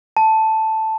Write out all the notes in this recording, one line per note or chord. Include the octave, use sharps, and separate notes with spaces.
A5